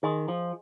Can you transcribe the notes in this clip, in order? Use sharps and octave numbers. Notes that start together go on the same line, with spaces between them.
D#3 G#4 D#5 G#5 C6
F3